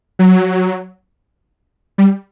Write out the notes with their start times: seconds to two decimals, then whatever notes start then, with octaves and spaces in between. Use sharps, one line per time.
0.19 F#3
1.98 G3